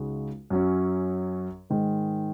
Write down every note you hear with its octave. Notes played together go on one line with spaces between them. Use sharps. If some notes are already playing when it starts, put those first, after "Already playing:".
Already playing: C#2 C#3 G#3 D#4 F#4
F#2 F#3 C#4
G#2 D#3 G#3